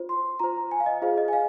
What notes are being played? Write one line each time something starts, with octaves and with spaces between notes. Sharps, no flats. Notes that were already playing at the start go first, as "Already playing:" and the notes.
Already playing: F4 C5
C6
F4 C5 A#5
G#5
F5
D#5
F4 G#4 C5 F5
D#5
G#5
F5